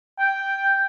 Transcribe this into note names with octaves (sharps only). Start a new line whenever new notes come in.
G5